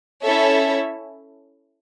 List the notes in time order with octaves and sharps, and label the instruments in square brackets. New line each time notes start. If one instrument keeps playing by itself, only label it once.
[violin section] C#4 E4 A4 C#5 E5